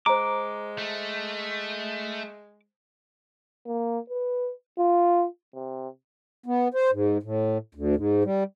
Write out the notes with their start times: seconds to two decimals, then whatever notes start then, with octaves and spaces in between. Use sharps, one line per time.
0.06 G#3 C5 A#5 D6
0.78 A3
3.66 A#3
4.10 B4
4.79 F4
5.55 C3
6.46 B3
6.74 C5
6.92 G#2
7.23 A2
7.75 D2
7.96 G#2
8.24 G3